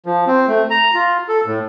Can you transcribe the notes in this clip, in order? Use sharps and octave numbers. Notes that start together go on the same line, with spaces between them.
F3
C4
A3
A#5
F4
A4
A2